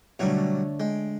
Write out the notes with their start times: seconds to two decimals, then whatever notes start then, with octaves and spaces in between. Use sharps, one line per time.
0.19 B2 D3 F#3 G3 A3 C#5
0.80 G#3 G5